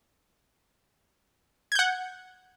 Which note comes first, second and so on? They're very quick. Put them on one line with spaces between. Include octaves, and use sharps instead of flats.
G#6 G6 F#5